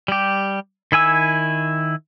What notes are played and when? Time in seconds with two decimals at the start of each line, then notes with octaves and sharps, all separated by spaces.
0.08 G3 G4
0.92 D#3 E4 G#5 E6